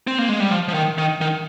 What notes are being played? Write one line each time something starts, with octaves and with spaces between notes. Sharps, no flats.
C4
A#3
G#3
G3
F3
F3
D#3
D#3
D#3